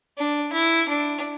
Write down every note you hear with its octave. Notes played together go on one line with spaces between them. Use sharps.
D4
E4
D4